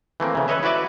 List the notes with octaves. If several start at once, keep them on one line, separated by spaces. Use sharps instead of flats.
E3 A3 A#3 C4
C#3 E3
A4 B4 C#5 D#5 E5
E4 F#4 B4 D5 E5